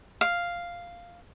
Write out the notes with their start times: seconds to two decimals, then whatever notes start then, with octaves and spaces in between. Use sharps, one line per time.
0.21 F5